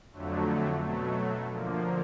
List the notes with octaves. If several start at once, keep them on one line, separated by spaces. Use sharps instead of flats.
F2 D3 F#3 A3
B2 F#3 A3
D3 F3 A#3